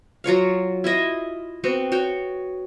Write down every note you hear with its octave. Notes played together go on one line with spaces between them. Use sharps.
F#3 F4 C#5 F5
E4 F4 D#5 E5
B3 C4 F#4
F#4 C#5 G5